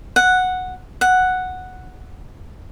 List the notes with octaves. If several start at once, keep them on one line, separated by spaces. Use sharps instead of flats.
F#5
F#5